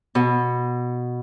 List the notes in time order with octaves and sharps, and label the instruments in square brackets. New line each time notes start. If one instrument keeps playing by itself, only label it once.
[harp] B2